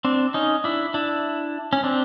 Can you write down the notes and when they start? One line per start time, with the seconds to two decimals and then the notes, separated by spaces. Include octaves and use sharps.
0.05 C4 D4
0.34 C#4 D#4
0.64 D4 E4
0.94 D4 E4
1.73 C#4
1.84 C4 D4